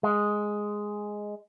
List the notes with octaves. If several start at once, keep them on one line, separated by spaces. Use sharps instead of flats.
G#3